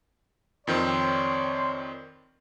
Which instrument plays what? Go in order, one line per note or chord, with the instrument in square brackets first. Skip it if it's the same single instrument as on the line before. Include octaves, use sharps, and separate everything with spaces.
[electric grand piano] F2 D#3 C4 [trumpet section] C#5 D5 C6